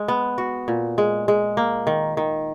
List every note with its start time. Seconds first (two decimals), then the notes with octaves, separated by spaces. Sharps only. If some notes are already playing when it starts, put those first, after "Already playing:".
Already playing: G#3
0.08 B3
0.38 F#4
0.68 A#2
0.98 G#3
1.28 G#3
1.57 A#3
1.87 D#3
2.17 D#3